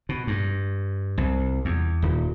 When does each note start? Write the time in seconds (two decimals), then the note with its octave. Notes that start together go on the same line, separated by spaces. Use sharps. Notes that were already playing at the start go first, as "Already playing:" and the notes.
0.09 B2
0.27 G2
1.18 C2
1.65 E2
2.02 D#1